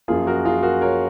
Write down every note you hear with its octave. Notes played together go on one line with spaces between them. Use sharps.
F#2 F3 A#3 F4 G#4
F#4 A#4
F4 G#4
F#4 A#4
A#4 C#5